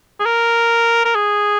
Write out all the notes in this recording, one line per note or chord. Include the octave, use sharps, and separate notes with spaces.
G#4
A#4
A#4
G#4